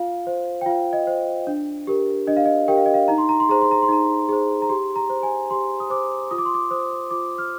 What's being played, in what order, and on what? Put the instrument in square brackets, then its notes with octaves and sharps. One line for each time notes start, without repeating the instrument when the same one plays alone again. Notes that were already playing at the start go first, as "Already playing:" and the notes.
Already playing: [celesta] F4 F5
C5
G5
F4 F5
D#5
C5
D4
G4 A#4
D4 D#5
F5
D#5
G4 A#4 G5
F5
D#5
F5
D#4 A#5
C6
A#5
C6
G#4 C5 A#5
C6
A#5
C6
D#4 A#5
G#4 C5
A#5
G4 C6
A#5
C5
G#5
G4 C6
D#6
C5 D6
F4 D#6
D6
C6
D6
C5 D#6
F4 D6
F6